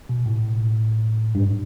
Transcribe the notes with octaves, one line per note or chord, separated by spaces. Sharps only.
B2
A2
G2